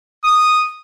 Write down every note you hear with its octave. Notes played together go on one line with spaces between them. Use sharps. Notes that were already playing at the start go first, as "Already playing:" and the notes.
D#6